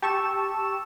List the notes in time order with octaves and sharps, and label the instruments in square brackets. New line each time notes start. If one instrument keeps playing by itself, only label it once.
[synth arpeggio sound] G4 A5 C#6 E6 E7